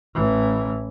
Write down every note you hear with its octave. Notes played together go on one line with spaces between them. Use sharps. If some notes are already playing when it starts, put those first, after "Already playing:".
A1 E3